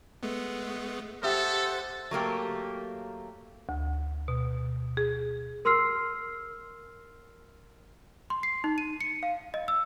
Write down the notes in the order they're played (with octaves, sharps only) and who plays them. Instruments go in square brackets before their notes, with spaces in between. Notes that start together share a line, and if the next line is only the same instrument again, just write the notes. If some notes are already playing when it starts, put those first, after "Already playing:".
[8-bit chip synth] G#3 A3 B3
[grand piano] G4 E5 D#6 [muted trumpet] A4 [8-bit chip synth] C5 F#5
[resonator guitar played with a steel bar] F#3 A3 A#3 G4
[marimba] D2
B2
G#4
[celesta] A#4 C6 E6 F6 C7
C6
C7
D#4
D#7
C#7
F5
D#5
E6